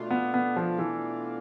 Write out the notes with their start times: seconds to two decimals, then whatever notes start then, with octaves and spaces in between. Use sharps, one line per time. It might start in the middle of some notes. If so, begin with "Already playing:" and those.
Already playing: B2 A3 D4 F4
0.10 B3
0.34 B3
0.56 F3
0.79 E3